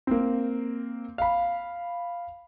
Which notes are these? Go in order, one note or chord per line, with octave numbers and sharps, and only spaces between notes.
A#3 C4
F5 B5